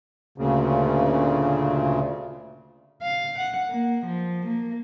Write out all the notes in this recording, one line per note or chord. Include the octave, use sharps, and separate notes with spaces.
D2 A#2 C#3
F5
F#5
A#3
F3
A#3